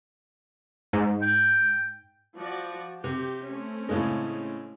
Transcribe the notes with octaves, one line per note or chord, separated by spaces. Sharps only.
G#2
G5
F3 F#4 D5
C3 G4
A3 C4 C#4
A2 C#3 G#3